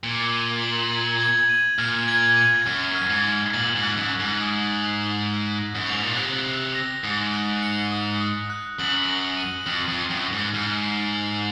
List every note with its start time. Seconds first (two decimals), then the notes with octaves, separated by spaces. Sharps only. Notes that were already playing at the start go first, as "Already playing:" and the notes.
0.04 A#2 G#6
0.33 D#7
0.62 F#7
0.91 G#6
1.20 G#6
1.49 D#7
1.78 A#2 F6
2.08 G#6
2.37 D#7
2.66 F#2 F6
2.95 F6
3.10 G#2
3.24 G#6
3.54 A#2 F#7
3.76 G#2
3.83 F#6
3.97 F#2
4.12 C7
4.20 G#2
4.41 D#6
4.70 F#7
5.00 F#6
5.29 F#6
5.58 A#6
5.75 F#2
5.87 G#2 F7
6.03 A#2
6.16 C3 F#6
6.46 F#6
6.75 A#6
7.04 G#2 D#6
7.33 F#6
7.62 C#7
7.92 D#6
8.21 D#6
8.50 F#6
8.79 F#2 F#7
9.08 A#6
9.37 D#7
9.66 F2 F6
9.88 F2
9.96 F#7
10.10 F#2
10.25 A#6
10.32 G#2
10.54 G#2 F6
10.84 C7
11.12 F7